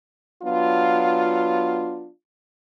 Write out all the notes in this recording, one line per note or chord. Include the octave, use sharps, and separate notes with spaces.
F#3 B3 D4 F4